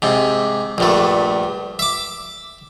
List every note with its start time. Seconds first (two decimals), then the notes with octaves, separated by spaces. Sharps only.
0.02 G#2 C3
0.78 A#1 G2 A3
1.79 E5 D6